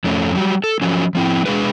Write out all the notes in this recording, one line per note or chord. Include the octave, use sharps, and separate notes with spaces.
F2 A3 C#4
F#3 G3
A4
F3 F#3 C#4
F3 C4 E4
G#3 D4 G#4 B4